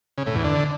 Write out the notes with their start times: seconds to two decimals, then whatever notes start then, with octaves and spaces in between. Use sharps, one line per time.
0.18 C#3
0.26 A2
0.35 E2
0.44 D3